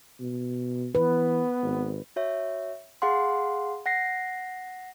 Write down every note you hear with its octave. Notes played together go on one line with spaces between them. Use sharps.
B2
E3 B3 B4
G#1
F#4 C#5 E5
G#4 F5 F#5 C6
F#5 A#6 C7